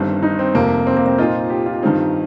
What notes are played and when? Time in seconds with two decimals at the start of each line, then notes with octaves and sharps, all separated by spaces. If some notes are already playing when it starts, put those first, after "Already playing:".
Already playing: G1 G2 D#3 G3 C4
0.23 D#4
0.39 C4
0.55 F1 F2 C3 G3 A#3
0.87 C4
0.97 A#3
1.06 C4
1.18 A#2 A#3 D#4 F4 C5 D#5
1.50 G4
1.66 F4
1.82 G2 D#3 C4 D#4